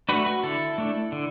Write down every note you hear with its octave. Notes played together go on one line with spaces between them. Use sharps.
A3 D4 F#4 B4
F#4
D3 E4 A4
A3 D4
D3